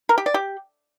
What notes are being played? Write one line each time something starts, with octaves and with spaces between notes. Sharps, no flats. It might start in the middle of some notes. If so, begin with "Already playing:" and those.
A#4
G4
D5
G4